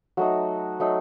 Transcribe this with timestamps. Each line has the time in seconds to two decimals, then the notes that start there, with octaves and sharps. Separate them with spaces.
0.17 F#3 A3 D#4 F#4
0.80 F#3 A3 D#4